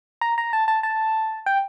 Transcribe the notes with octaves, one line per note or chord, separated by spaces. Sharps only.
A#5
A#5
A5
A5
A5
G5